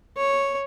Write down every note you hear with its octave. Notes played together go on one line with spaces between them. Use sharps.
C#5